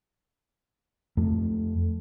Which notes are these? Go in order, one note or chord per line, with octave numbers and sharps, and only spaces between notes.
F2 A3